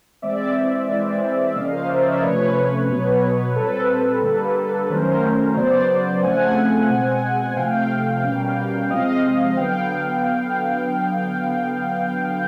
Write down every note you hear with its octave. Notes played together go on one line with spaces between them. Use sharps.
E3 G#3 C4 D5 E5
E3 G#3 C4
E5
C#3 F3 A#3 C#4 D#5 F5
A#4 C5
D5 E5
C#5 D#5
C5
C3 F3 A3 C#4 B4 C#5
B2 F#3 B3
A#2 G3 C4 A4 B4
D3 G3 A#3
D#3 F#3 A3 C#4 A#4 C5
C#3 F#3 B3 C5 D5
C#3 F3 A3 C4 F#5 G#5
B2 G#3 C4
C3 F3 A3 F5 G5
B2 G3 A#3 C#4
C3 F3 G#3 C4 D#5 F5
D3 F#3 B3 F5 G5